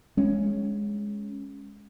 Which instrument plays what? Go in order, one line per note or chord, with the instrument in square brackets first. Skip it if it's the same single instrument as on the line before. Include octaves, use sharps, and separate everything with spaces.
[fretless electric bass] G#3 C#4